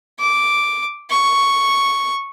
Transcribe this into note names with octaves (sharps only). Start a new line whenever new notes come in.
D6
C#6